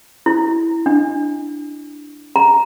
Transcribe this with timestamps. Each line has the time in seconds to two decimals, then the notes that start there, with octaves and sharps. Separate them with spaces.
0.26 E4
0.86 D4
2.36 A#5